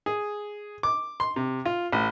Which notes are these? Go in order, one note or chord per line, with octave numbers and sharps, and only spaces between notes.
G#4
D6
C6
C3
F4
A1